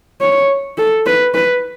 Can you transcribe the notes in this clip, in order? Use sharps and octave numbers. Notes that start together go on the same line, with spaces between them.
C#5
A4
B4
B4